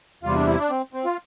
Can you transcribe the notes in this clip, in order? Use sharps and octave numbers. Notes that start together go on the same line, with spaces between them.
E2 C3 G3 F4
D4
E4
D4
C4
C4
F4